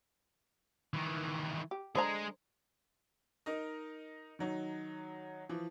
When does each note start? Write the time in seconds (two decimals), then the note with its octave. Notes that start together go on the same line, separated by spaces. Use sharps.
0.94 D#3 E3
1.71 G4
1.95 D3 G#3 G#4 C5 A#5
3.46 D#4 A#4 D#5
4.39 D#3 F#3 D#4
5.49 E3 F3